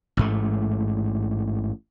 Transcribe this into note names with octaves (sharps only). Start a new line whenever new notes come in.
A1 G#2 A3